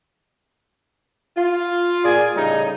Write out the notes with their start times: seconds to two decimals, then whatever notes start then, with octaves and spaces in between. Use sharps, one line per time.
1.36 F4
2.04 A#2 G#4 D5 G#5
2.35 A2 C#3 G3 D#4